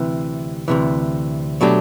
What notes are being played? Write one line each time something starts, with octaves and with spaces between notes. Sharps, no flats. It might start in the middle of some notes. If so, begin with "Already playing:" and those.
Already playing: D2 C3 E3
D2 C3 E3
B2 F#3 A3 D4 G4